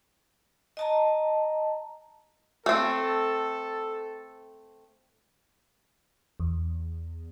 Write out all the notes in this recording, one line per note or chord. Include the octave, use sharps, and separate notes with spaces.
D#5 A5 A#5
A3 C4 A4
E2